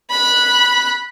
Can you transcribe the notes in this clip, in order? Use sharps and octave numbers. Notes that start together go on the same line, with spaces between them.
B5 F#6